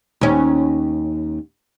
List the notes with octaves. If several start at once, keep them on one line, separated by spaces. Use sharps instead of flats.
D#2 C#4